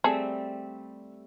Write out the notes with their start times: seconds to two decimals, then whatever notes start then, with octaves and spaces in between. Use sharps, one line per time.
0.04 G3 A3 C4 G#4 A4